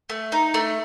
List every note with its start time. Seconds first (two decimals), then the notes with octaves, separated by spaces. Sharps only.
0.10 A3
0.32 D#4
0.54 A3